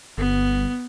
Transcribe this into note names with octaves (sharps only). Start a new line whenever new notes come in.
G1 B3